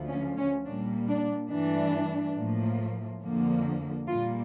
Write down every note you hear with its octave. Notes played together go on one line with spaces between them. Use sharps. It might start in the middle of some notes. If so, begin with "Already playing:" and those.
Already playing: D2 D3 F3
C#4
C#4
A#2 G3 A#3 D4
D4
G2 E3 A3 D4
A2 F3 A#3
F2 D3 F3 A#3
A#2 G3 A#3 F4